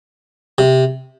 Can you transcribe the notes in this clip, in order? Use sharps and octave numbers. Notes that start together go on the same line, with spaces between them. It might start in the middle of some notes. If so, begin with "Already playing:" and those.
C3